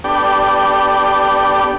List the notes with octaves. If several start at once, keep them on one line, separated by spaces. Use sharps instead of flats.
B3 D4 G4 A4 D5 G5